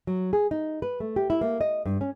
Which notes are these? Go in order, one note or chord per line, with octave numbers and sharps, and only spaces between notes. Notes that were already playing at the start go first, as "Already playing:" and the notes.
F#3
G#4
D#4
B4
A3
G4
E4
A#3
D#5
G2
C#4